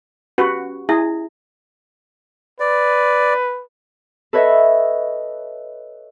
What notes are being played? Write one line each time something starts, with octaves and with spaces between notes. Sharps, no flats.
C#4 F#4 G4 B4
E4 G#4 E5
B4 D5
A4 B4 C#5 D#5 E5